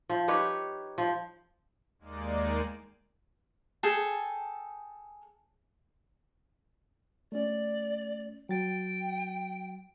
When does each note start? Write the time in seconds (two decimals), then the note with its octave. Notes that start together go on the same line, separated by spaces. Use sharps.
0.09 F3
0.28 D#4 G4 B4 C#5
0.98 F3
1.99 D#2 G#3 A#3 D#4 D5
3.83 G#4 A4 G5 A5
7.32 A3 C#4 D5
8.49 F#3 G5 A6